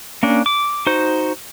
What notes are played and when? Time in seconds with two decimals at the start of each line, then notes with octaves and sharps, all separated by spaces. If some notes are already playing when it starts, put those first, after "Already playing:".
0.23 A#3 C#4 D4
0.46 D6
0.87 D#4 F#4 C5